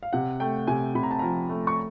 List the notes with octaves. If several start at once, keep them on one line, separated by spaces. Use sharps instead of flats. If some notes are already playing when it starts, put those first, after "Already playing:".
F5
C3 F#5
A3 G5
C3 G#5
C3 B5
A#5
A5
F3 A#5
A3
C#6